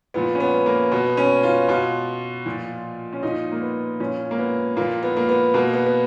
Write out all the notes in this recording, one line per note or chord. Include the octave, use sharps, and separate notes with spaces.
A#2 F3 B3
C#4
B3
A#3
B2 B3
C#4
F4
B2 F4
A#2 F3
C#4
A#2 F3 D#4
A#3
B3
A#2 F3 C#4
A#3
B3
A#2 F3 A#3
B3
A#3
B3
B2 A#3
B3
B3